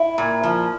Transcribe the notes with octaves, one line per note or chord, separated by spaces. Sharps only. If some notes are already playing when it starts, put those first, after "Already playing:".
Already playing: E4
A#2
F3